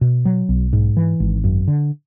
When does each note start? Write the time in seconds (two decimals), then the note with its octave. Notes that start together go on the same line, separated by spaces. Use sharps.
0.01 B2
0.25 F#3
0.49 B1
0.73 G#2
0.97 E3
1.20 G#1
1.44 F#2
1.68 D3